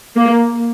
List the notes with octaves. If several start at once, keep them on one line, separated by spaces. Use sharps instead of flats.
A#3